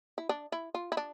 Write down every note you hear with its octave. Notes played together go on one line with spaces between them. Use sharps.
E4
D4
E4
F4
E4
D4